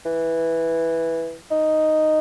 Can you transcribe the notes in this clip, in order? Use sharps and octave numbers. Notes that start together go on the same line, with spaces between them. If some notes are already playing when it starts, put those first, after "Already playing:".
E3
D#4